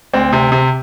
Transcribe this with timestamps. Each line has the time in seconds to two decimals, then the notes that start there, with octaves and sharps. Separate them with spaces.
0.13 D2 C4
0.33 C3
0.52 C3